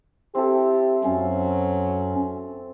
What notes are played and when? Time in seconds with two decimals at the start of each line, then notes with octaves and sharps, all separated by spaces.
0.35 C4 E4 G4 A4
1.04 F#2 F#3 C#4 F5